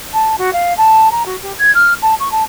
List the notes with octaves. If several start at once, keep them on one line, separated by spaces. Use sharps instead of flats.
A5
F#4
F5
A5
A#5
F#4
G4
G#6
F6
A5
C#6
A5